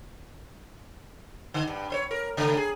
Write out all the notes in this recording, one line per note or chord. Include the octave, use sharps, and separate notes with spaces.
D3
G2
B3 C5 C#5
A#4
G2 C#3 A3
G#4